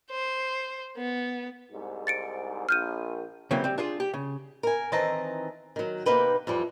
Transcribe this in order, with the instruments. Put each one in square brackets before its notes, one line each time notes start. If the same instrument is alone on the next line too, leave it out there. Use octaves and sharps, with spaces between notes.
[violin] C5
B3
[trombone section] C2 G#2
[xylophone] A6 C#7 D7
[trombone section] A#1 [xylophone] F6 G6 D#7
[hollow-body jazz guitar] C#3 E3 F#3 G3 A#3 C4
G3 C4
D4 F4 G#4
G4
C#3
[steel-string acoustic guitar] A#4 G#5
D#3 E3 C4 D#5 A5 A#5
D#3 F#3
C3 A#3 D#4 B4 G5
F2 E3 G3